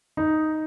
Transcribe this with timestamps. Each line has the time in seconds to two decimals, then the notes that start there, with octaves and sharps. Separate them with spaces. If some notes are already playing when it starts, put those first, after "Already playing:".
0.17 D#4